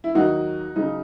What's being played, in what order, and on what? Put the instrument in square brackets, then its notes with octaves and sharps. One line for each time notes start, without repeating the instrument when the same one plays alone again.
[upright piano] E4
D#2 D#3 F#3 D#4 F#4
C#3 F#3 D#4